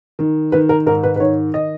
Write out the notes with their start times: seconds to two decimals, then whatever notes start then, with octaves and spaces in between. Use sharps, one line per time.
0.19 D#3
0.52 D#3 B4
0.69 A#4
0.86 G#2 A#4
1.03 B4
1.16 B4
1.20 D#3 C#5
1.54 D#5